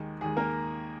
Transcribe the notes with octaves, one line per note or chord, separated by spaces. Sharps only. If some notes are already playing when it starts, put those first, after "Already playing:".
Already playing: D#2 D#3 G#3
D#2 D#3 G#3 G#4
A#3 A#4